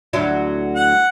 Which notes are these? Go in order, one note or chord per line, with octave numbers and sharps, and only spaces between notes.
D2 F#3 E4
F#5